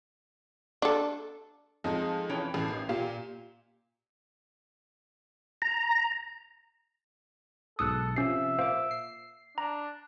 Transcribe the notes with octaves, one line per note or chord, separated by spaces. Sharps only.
D4 A4
F2 G#3 C4 D#4
E3 C#4 G5
A1 E3 A4
A#3 D#4
A#2 G4 F5
A#5
B1 G#2 A4 D#6 E6 F#6 C#7
C3 F3 C#4 E5 C7
A#2 C5 F5 D6
C7
D4 A#5